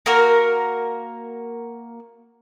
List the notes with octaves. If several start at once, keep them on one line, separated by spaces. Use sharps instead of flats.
A#3 F#4 A#4